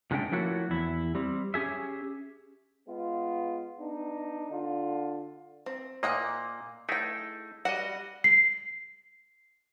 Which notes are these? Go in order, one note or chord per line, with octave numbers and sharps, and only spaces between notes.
A#2 D3 G#3 A3 C#4 G5
F3 A3 A#3 E4 F#4 C#5
E2 E4
G3 C4
C#4 G4 G#4 E5
G#3 B3 F4
B3 D4 D#4
D3 F4
C4
A#2 A#3 D#5 F#5 G5
A3 D#4 E4 G#4 G5
G3 F#4 D#5 F#5
C7